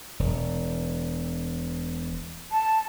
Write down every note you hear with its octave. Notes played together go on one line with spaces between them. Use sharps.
E1
A5